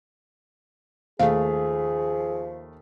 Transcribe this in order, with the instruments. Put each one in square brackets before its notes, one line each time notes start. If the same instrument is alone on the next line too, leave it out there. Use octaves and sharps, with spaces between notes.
[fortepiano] D#2 A3 [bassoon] F3 [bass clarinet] G#4 [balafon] F5